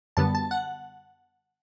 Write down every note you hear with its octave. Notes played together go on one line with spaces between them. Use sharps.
F#2 D3 G3 B3 A5
A5
F#5